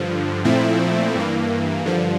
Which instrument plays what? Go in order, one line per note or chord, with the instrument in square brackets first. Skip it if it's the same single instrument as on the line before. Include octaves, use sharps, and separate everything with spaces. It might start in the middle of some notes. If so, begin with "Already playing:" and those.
Already playing: [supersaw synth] G2 D3 F3
A#2 F3 A3 C4 E4
G2 E3 A#3
G2 D3 F3